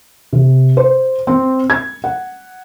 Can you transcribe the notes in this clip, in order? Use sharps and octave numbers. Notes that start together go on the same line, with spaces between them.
C3
C5
C4
G#6
F#5